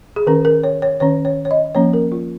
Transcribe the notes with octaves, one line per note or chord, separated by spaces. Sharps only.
G#4
D#3 C#4 A#4
A#4
C#5
C#5
D#3 C#4 C#5
C#5
C#5
D#5
F3 A#3 C#4 C#5
A#4
F4